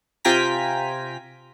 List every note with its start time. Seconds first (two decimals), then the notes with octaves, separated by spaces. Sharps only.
0.25 C3 F4 G5 G#5 A#5 B6